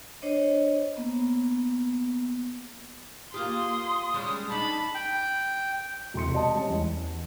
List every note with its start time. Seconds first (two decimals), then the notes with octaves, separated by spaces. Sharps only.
0.22 D4 C5 C#5 D#5
0.97 A#3 B3
3.34 A#3 F4 G4 C6 D#6
4.14 G3 G#3 C#4
4.49 D4 D#4 A5 B5
4.95 G5
6.14 E1 C3 C6 C#7
6.34 D#5 A5
6.55 G3 G#3 C#4
6.69 E2